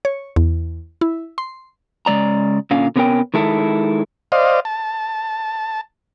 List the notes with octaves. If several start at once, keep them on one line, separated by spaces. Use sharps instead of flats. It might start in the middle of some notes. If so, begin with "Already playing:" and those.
C#5
E2
E4
C6
C#3 G#3 D5 A#5
A#2 D3 C#4 F5
C3 A#3 B3 C#4 A#4 G5
D#3 G#3 E4 A4
C5 D5 D#5 F5
A5